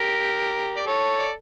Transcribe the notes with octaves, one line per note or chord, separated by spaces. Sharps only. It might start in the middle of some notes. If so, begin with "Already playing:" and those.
Already playing: G4 A#4
D5
A4 C#5
D5